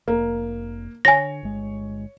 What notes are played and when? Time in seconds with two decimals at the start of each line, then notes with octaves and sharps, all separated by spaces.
0.08 F1 A#3
1.05 D3 C#5 G#5 A#6
1.43 G1 G#3